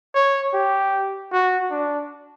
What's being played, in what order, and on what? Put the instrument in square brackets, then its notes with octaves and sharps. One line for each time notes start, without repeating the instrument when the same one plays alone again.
[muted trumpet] C#5
G4
F#4
D4